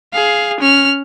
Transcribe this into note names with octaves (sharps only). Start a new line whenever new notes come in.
G#4 F5
C#4 F6